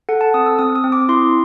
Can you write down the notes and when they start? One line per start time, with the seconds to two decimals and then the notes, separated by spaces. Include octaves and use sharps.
0.09 A4 F#5
0.21 A5
0.34 C4 D#6
0.46 E6
0.59 C4 D#6
0.76 D#6
0.84 C4
0.92 D6
1.09 E4 C6